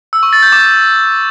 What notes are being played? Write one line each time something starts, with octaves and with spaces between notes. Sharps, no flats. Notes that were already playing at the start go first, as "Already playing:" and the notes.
E6
C#6
A6
G6
D6